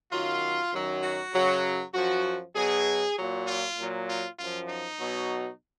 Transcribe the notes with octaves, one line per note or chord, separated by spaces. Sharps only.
F#2 D#3 F#3 F4
F#2 D#3 F#3
F#4
F#2 C#3 F#3
F#2 F3 F#4
B2 F#3 G#4
A#2 F#3
F4
A#2 F#3
F4
F#2 F3 F4
D#4
B2 F#3